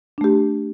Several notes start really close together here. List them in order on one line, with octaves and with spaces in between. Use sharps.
D4 A3 G4